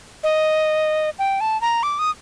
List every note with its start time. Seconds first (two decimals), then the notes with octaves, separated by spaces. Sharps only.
0.24 D#5
1.19 G5
1.41 A5
1.61 A#5
1.83 D6
1.99 D#6